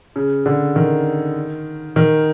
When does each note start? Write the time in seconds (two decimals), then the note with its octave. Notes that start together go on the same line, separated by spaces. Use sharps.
0.16 C#3
0.46 D3
0.76 D#3
1.96 D#3